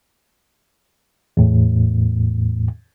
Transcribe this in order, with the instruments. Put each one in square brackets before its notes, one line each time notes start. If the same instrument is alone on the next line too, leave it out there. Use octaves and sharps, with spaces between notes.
[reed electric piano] E2 A2